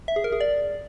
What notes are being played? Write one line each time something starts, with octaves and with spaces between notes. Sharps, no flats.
E5
G#4
A#4
G#4
D5